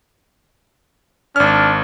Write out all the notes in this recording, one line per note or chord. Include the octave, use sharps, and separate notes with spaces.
G#1 D4 F6